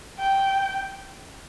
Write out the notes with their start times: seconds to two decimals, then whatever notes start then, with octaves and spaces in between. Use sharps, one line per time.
0.20 G5